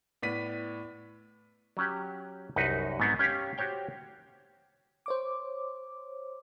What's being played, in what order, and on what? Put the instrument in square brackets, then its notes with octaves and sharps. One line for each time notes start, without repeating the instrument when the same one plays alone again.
[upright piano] A2 B3 D5 B6 D#7
[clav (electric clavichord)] F#3 C#4 G4
C2 F#2 D#4 F#4 B4
G#2 F#3 B3 C4
C#4 G4 F5
F#4 G4 C5 C#5 G5
[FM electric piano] C5 C#5 D6